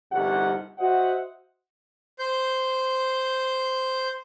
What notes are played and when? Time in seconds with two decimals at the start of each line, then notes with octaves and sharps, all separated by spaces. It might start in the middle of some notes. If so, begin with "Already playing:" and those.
0.11 G1 C2 F2 D#4 G4 F#5
0.78 F#4 C5 D#5 E5 F#5
2.19 C5 G6